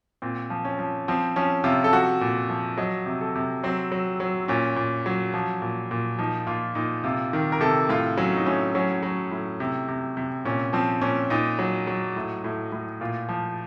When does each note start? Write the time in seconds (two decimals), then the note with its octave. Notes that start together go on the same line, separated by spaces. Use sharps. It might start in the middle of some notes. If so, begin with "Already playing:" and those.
0.22 A#2 C4
0.50 F3
0.65 C#4
0.79 F3
1.08 F3 C4
1.36 F3 C#4
1.64 C3 F4
1.84 A4
1.93 F3 F#4
2.21 A#2
2.50 F3
2.77 F#3 D#5
3.06 C3
3.21 A4
3.35 C3
3.63 F#3 C4
3.92 F#3
4.20 F#3
4.48 A#2 C#4
4.76 A#2
5.06 F#3
5.34 F3
5.62 A#2
5.91 A#2
6.19 F3 D#4
6.47 A#2 F4
6.75 A#2 D#4
7.04 C3 F4
7.33 D#3
7.52 A#4
7.61 C3 A4
7.89 A2 F4
8.17 F#3 C#4
8.36 D#4
8.46 A2 C#4
8.75 F#3 C#4
9.03 F#3
9.31 A2
9.60 C3
9.88 C3
10.17 C3
10.45 A#2 C#4
10.73 F3 C4
11.01 A#2 C#4
11.30 A#2 D#4
11.59 F#3
11.87 F#3
12.16 A2
12.44 A2
12.72 A2
13.01 A#2 F4
13.29 F3